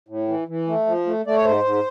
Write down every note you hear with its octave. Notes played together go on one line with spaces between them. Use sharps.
A2
E3
E3
A3
F3
A3
A3 D5
C#5
G#2 C5
G#2